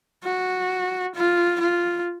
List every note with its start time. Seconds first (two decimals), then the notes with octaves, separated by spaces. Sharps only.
0.24 F#4
1.15 F4
1.61 F4